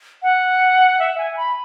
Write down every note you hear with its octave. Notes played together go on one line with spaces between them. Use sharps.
F#5
E5
G#5
B5